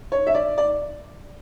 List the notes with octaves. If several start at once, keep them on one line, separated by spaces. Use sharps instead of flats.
C#5
E5
D5
D5